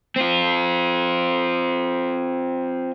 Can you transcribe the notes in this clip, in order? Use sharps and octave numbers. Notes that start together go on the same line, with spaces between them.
C4 F4